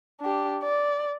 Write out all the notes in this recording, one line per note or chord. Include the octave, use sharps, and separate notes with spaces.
D4 G4
D5